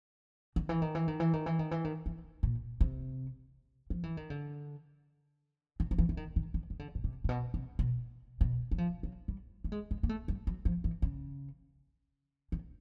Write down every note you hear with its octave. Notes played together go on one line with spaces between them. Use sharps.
D#3
E3
D#3
E3
D#3
E3
D#3
E3
D#3
E3
D#3
E3
A#2
C3
F3
E3
D#3
D3
D#3
F3
E3
E3
D#3
D#3
D#3
D#3
D3
B2
C3
A#2
B2
C3
B2
B2
F#3
F3
F#3
G3
A3
G#3
G#3
A#3
A3
G3
F#3
F3
E3
C#3
D#3